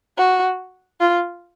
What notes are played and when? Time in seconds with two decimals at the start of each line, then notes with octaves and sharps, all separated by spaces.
0.18 F#4
1.00 F4